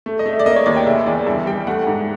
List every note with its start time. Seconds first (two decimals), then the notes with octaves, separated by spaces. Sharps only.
0.06 A3
0.19 D#5
0.26 A3
0.33 E5
0.39 D5
0.46 A#3 D#5
0.51 D5
0.56 C#5
0.66 D#2 D5
0.76 G5
0.86 C#3 E5
1.06 E2 D5
1.26 G2 E5
1.47 G3 G5
1.67 A3 F#5
1.87 G#2